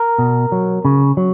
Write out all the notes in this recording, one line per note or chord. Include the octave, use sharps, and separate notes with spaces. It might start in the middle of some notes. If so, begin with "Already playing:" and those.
Already playing: A#4
B2
F#3
C#3
F#3